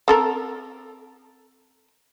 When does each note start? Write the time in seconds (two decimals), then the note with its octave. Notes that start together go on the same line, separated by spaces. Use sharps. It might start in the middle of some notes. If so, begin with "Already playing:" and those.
0.08 C4 A4 A#4